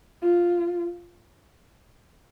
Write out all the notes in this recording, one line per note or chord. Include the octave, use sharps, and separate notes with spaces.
F4